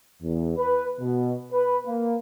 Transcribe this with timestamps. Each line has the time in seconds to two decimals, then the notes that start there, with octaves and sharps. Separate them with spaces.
0.22 E2
0.56 B4
1.00 B2
1.52 B4
1.85 A#3